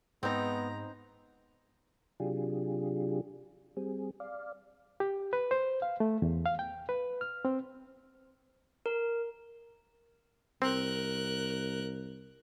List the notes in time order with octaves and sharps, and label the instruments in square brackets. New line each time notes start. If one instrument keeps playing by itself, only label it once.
[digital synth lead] G#2 [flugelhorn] B3 [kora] C4 D#4 [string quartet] A#5
[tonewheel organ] C3 F#3 D4 F4 G4 G#4
G3 C4 G#4
D5 F5
[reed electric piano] G4
B4
C5
F5
A3
E2
F5
G5
B4
F6
C4
[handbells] A#4
[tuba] C2 [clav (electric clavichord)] C4 [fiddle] A#4 F#6